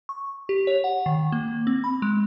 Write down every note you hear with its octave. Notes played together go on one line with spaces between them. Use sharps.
C#6
G4
C#5
F#5
D#3
A#3
C4
B5
G#3